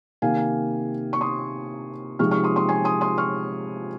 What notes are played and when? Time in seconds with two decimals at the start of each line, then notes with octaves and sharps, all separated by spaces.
0.22 C3 D#3 A#3 F5 G#5
1.13 C#6
1.21 C6 D#6
2.19 C3 F3 G#3 D#4 C#6 F6
2.31 C#6 F6
2.44 C6 D#6
2.56 C6 D#6
2.69 G#5 C6
2.85 C6 D#6
3.01 C6 D#6
3.18 C#6 F6